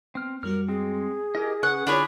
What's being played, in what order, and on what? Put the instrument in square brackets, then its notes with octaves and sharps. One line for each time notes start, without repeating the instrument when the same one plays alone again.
[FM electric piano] B3 [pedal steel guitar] C4 F6
[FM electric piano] F#2 G3 F#4 [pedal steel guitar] A#4 F6
[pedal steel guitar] G#3 C4 [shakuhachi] G#4
[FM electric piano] E4 [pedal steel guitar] G4 A#4 D#5
[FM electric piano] C#3 [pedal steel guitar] C#4 B4 C#6 [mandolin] F#5
[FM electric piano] D3 E4 F4 [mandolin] D4 G#4 C#5 [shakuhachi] B5